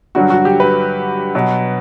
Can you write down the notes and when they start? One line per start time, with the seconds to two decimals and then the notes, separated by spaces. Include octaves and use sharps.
0.15 G2 D3 F#3 F#4
0.30 F#4
0.45 G4
0.60 B4
1.35 B2 F#3